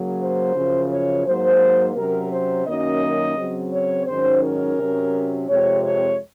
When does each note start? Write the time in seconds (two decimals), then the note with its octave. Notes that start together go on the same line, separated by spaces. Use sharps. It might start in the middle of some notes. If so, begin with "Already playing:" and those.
Already playing: C#3 F#3 A#3
0.21 C5
0.56 F#2 C#3 F3
0.91 C#5
1.26 G#2 F#3 A#3 C5
1.96 C3 F#3 C#4 A#4
2.32 C5
2.67 F#2 D#3 F#3 A#3 C#4 D#5
3.37 C#3 F#3 C4
3.72 C#5
4.07 G#2 D#3 F#3 C#4 C5
4.43 A#4
4.78 C3 F#3 C#4
5.48 F2 C3 F3 G#3 C4 C#5
5.84 C#5